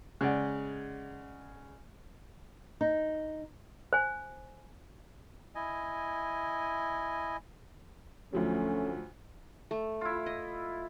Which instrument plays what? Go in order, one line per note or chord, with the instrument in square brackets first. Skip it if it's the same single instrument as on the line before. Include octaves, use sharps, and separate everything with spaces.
[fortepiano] C#3 G#3 D5 F#5
[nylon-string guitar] D#4
[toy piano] C5 G#5
[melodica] E4 D#5 G#5
[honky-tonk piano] D2 F3 F#3 [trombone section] A3 C#4
[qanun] A3
[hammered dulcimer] E4 F4
[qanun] D#5